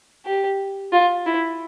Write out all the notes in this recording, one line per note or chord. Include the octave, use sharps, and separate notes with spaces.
G4
F4
E4